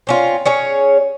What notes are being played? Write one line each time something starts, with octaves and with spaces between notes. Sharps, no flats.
C4 C#4 F4
C#4 G#4 C#5